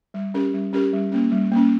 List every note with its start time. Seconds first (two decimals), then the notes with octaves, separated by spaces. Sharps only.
0.14 G3
0.34 C#4 G4 A#4
0.54 G3
0.73 C#4 G4 A#4
0.93 G3
1.12 A#3 C#4
1.32 G3
1.51 A#3 C#4